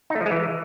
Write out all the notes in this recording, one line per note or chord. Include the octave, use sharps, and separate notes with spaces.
D#4
A3
F3
G#3
E3